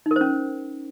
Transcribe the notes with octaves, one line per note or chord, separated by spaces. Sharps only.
D#4
A#4
C5
C#4